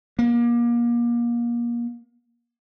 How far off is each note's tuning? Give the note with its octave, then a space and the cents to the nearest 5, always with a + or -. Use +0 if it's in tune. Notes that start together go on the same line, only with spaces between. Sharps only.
A#3 +30